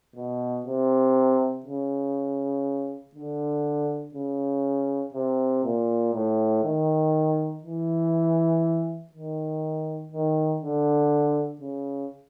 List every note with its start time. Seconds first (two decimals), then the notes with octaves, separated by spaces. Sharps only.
0.16 B2
0.66 C3
1.66 C#3
3.15 D3
4.14 C#3
5.14 C3
5.64 A#2
6.14 A2
6.63 D#3
7.63 E3
9.13 D#3
10.12 D#3
10.62 D3
11.61 C#3